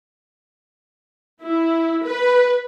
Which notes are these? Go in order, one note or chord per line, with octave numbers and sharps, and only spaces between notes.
E4
B4